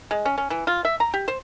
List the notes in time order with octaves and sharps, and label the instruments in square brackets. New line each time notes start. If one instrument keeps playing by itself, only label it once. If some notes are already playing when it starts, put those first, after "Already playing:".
[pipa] G#3
C#4
C#4
E3
F4
E5
A#5
G4
C5